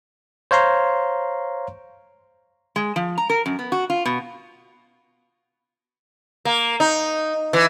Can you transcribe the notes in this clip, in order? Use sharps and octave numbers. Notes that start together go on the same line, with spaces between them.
C5 C#5 F5 A#5 C6
G#3
F3
A#5
A#4
F#2
B3
F#4
F4
B2
A#3
D#4
E3